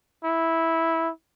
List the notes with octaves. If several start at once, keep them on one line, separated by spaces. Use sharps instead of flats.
E4